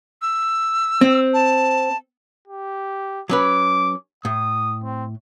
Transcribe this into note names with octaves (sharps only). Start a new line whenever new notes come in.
E6
C4
A5
G4
F#3 C#4 B4 D6
A2 D#6
C4